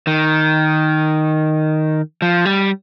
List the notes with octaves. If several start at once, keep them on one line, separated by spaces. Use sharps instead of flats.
D#3
F3
G3